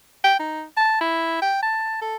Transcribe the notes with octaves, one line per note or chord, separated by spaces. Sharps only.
G5
D#4
A5
E4
G5
A5
A4